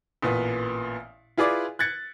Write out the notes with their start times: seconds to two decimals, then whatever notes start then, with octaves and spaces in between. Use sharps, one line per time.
0.22 A1 A#2 B3
1.38 E4 F4 G#4 B4 D5 D6
1.79 F#6 G#6 A6 C#7